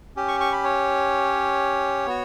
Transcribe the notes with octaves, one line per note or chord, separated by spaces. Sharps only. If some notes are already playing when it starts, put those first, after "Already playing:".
C#4 G4
C#6
C#6
B5
C#5
B3 F#4